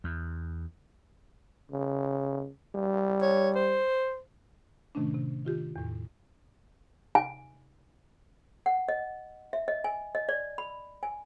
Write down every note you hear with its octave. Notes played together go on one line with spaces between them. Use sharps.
E2
C#3
G3
C#5
C5
A2 C3 D#3 A3 C#4 D4
C3
D#3 F4 G4
E2 A2
G#5
F#5
D#5
E5
D#5
G#5
D#5
D5
B5
G#5